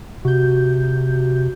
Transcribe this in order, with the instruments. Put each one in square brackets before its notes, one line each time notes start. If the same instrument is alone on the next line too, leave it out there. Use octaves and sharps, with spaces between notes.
[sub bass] C3 [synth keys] F#4 G6